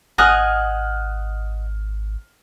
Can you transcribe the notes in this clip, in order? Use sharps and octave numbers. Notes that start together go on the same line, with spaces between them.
G#1 D#5 F#5 G#5 D#6 F6 F#6